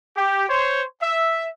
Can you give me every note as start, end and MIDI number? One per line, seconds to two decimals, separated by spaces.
0.16 0.46 67
0.49 0.82 72
0.49 0.82 73
1.02 1.46 76